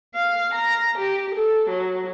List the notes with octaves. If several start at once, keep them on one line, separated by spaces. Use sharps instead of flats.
F5
A#5
G4
A4
F#3